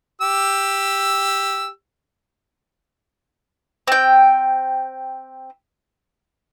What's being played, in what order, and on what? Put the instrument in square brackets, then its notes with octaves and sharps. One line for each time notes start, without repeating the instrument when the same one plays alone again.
[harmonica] G4 E6
[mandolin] C4 G5